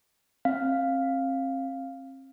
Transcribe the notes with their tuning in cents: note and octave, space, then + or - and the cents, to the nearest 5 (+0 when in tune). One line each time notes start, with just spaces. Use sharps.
C4 +40 F5 +0